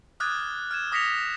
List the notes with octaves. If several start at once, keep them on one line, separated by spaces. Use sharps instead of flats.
D6 D#6 F6 F#6 G#6 A6
F6 G#6 E7
D6 D#6 A#6 B6 C#7 F7